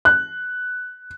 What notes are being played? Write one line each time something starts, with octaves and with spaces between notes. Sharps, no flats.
F#6